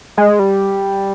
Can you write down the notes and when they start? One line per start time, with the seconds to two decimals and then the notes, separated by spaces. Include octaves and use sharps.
0.17 G#3
0.39 G3